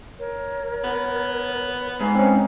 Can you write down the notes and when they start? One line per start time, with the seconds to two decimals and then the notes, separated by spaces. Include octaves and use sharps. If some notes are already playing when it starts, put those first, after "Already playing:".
0.18 A#4 C#5
0.84 B3
2.01 G#2 B4 F5
2.15 C4 C#4